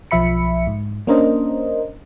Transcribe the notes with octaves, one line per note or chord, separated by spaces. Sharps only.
B1 F3 E5 B5 C#7
G#2
A#3 C#4 D4 A#4 C5 D#5